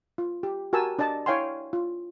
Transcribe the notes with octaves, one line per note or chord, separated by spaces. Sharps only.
F4
G4
F#4 G4 A#4 G#5 A5 E6
D4 D5 D#5 A5
E4 C#5 F5 G5 G#5 C6
F4